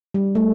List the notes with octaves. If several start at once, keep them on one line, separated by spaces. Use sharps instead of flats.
G3
A3